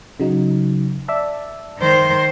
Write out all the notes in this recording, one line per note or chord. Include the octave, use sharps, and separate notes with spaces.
C#3 F#3 D#4
D5 E5 A5
D#3 C5